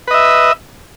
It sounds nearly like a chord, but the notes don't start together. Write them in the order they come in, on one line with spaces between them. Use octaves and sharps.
B4 D#5 E5